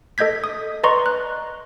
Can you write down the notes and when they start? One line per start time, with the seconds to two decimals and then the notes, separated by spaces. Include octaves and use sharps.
0.18 A4 D#5 G6 G#6 B6
0.44 D#6
0.83 B4 D5 D#5 A#5 C6 C#6
1.06 F#6